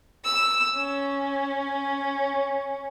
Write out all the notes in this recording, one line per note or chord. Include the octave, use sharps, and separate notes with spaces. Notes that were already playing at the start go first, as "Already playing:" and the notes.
E6
C#4